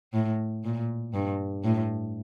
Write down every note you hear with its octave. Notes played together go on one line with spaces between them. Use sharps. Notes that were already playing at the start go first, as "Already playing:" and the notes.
A2
A#2
G2
A2